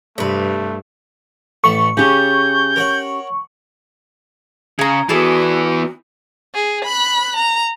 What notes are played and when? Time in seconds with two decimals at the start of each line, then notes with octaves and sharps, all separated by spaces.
0.18 G2 C3 A3 B4
1.64 A1 A3 C#6
1.97 C#3 C#4 G4 G6
2.76 A#4 C#5 F#5
4.79 C#3 G#4 A#5
5.09 E3 B3 F#4 G#4 A4 D5
6.55 G#4
6.85 B5 F#6
7.37 A#5